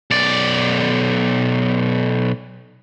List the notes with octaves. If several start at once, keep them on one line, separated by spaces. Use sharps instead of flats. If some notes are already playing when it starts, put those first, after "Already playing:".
B1 D5